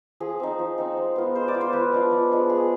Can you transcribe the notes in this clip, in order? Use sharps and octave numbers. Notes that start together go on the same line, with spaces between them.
F3 G#4
C4 D#4
F3
C4 D#4
G#3
B3 F4
G#3 C5
D5
B3 F4
C5
F3 B4
G#3 D4 F4
F3
G#3 D4 F4
G#3 G#4